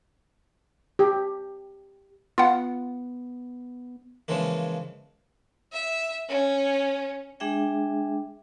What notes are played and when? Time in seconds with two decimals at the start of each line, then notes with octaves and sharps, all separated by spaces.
0.99 G4
2.38 B3 F4 F#5
4.28 C#3 E3 F3 G#3 A#3
5.72 E5
6.29 C#4
7.40 G#3 D4 G#4 E5 G5